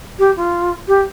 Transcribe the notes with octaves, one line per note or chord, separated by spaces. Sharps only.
G4
F4
G4